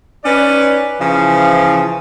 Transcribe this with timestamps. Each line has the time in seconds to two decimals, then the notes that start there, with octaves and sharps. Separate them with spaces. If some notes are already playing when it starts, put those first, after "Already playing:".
0.25 C#4 D#4 B4 D5
1.01 C#3 E3 F3